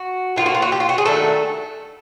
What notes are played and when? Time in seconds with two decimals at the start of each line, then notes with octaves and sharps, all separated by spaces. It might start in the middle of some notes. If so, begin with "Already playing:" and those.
Already playing: F#4
0.36 A2 F3 A#3 F4
0.46 F#4
0.55 F4
0.62 F#4
0.72 G4
0.80 F4
0.89 F#4
0.98 G#4
1.06 D#3 F#3 A3 D4 A4